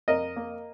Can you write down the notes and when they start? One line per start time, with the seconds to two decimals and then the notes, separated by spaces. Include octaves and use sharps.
0.08 F2 A#4 D#5
0.36 A#3